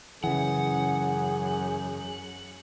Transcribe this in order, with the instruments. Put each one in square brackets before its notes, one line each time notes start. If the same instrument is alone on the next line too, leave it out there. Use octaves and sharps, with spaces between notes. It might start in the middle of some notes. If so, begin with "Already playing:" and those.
[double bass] F#2 [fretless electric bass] C#3 E3 [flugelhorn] G#4 [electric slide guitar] F#5